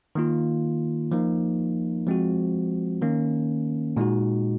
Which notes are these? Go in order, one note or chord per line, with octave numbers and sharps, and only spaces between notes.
D#3 A#3 F4
F3 A#3 D#4
F3 G#3 C4 F#4
D#3 A#3 C#4
A#2 G#3 D#4 F#4